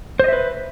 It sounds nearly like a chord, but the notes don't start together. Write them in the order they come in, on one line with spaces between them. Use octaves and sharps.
C5 D#5 E5 B4